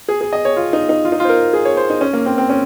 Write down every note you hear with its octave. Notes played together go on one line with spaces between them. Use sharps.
G#4
G#4
D#5
C#5
F4
D#4
D#4
F4
D#4
F4
C5
A#4
G#4
C#5
C5
D#4
C#4
A#3
C4
C4
C#4